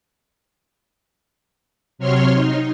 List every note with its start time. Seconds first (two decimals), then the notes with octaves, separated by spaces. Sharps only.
1.99 C3 F#3 C#5 C6 F6
2.33 D#4